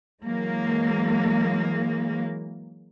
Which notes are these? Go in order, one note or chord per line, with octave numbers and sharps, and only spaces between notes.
E3 F#3 G#3 A#3